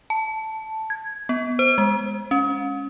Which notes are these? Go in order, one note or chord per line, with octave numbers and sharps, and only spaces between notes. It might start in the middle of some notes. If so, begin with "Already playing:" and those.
A5
G#6
B3
C5
G#3
C#4